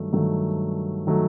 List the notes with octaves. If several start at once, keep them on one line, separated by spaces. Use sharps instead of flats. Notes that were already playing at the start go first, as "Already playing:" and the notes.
Already playing: G2 D#3 F#3 A3
G2 D#3 F#3 A3
D#3 F#3 A3